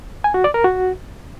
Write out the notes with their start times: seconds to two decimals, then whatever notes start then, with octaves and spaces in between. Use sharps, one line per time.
0.24 G#5
0.34 F#4
0.44 D5
0.54 A#4
0.64 F#4